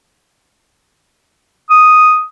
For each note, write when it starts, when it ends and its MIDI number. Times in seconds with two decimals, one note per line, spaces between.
1.71 2.24 87